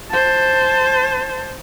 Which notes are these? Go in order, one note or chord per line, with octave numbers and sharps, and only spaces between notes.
C5 A5